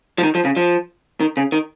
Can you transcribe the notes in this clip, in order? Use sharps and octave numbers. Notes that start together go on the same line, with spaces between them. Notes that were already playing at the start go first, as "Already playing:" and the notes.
F3
D#3
F3
C#3
F3
D#3
C#3
D#3